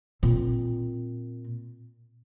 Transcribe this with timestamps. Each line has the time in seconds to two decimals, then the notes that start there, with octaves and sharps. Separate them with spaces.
0.23 A#2 C4